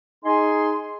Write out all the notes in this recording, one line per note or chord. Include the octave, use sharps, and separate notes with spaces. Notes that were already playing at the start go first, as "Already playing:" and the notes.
D#4 G#4 D#5 G#5 C6